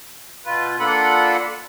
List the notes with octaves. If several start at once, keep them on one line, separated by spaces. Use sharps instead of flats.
B2 F4 B4
A#3 D4 F4 A4 F#5 B5